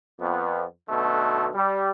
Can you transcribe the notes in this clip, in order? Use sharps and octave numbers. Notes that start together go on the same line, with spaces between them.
F2 B3
B1 B2 D3 A3
G3